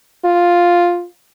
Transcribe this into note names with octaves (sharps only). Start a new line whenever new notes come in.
F4